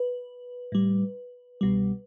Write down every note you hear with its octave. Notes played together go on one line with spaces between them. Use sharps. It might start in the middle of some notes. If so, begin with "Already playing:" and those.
Already playing: B4
A2 G3
C2 B2 G3